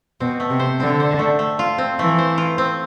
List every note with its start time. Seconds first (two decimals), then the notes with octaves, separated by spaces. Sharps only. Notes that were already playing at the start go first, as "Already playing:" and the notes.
0.20 B2 C4
0.40 A3
0.50 C3
0.60 C5
0.80 D3 C4
1.00 C5
1.19 A3
1.39 A3
1.59 F4
1.78 C4
1.98 E3 A3
2.18 C5
2.38 F4
2.58 C4